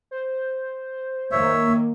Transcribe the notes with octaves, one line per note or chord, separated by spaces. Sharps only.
C5
D#3 A#3 C#5 E5